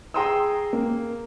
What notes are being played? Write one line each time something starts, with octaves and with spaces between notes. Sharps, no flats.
G#4 G5 A#5 C6 D#6 E6
A#3